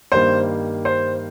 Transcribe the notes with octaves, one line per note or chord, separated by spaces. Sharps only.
G2 D#3 G3 A#3 C5
C5